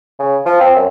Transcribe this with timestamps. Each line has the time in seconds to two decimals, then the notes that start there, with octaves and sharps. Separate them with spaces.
0.19 C#3
0.46 F3
0.61 C4
0.76 F#2